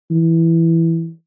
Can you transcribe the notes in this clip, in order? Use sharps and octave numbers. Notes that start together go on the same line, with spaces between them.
E3